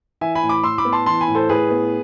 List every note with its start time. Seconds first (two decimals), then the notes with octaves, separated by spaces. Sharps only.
0.21 E3 E5 G#5
0.35 G#5 B5
0.43 A2
0.49 B5 D6
0.63 A2 C6 E6
0.78 B5 D6
0.85 B3
0.92 A5 C6
1.06 E3 A5 C6
1.21 G#5 B5
1.28 A2
1.35 A4 C5
1.49 A2 G#4 B4
1.71 B3